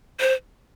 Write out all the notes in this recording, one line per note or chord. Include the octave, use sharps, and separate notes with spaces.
C5